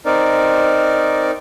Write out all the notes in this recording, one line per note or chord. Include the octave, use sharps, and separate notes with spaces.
C4 D#4 A#4 D5